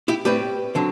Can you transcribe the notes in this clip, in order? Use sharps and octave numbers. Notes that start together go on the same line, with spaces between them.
E4 G4
A2 G3 C4 G4 B4
D3 F#3 C4